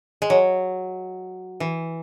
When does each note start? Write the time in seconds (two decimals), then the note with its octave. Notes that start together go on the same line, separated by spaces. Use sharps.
0.22 G#3
0.30 F#3
1.60 E3